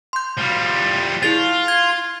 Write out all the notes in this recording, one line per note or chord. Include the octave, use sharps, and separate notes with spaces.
C6 G6
F3 G3
E4 F4 G#4 A6
G#6